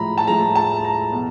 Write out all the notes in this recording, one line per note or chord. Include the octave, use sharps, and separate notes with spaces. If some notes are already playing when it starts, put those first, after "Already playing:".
Already playing: A2 F3 G#3 A#5 B5
A5
A2 F3 G#3 A#5
A5
A#5
B2